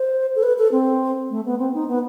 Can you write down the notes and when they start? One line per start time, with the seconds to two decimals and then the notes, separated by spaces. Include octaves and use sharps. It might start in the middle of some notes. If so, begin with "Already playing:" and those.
Already playing: C5
0.36 A4
0.43 B4
0.58 A4
0.72 C4
1.31 A3
1.45 B3
1.59 C4
1.74 D#4
1.88 B3